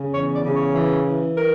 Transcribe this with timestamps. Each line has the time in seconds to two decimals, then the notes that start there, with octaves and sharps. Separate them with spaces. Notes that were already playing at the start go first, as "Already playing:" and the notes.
Already playing: C#3
0.12 E2 C#5
0.34 D5
0.44 C#3
0.54 C#5
0.74 E3
1.05 E3
1.36 A#4